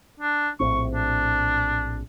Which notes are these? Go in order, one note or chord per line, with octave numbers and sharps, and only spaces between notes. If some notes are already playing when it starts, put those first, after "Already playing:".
D4
A#1 A2 C4 C#6
D4